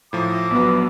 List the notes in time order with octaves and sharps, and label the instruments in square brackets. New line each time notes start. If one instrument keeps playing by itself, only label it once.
[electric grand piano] A2 F3 [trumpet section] E5 A#5 D6
[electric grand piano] A#1 F#3 [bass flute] B3